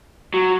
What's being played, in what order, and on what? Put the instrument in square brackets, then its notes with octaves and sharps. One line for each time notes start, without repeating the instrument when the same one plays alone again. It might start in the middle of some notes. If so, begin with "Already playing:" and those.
[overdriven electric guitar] F#3